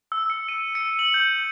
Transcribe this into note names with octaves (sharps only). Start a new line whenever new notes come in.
E6
C#7
D#7
C#7
F#7
G6